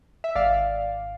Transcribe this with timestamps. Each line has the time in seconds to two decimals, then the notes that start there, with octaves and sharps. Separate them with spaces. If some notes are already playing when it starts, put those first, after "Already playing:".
0.24 E5
0.35 G#1 D5 F5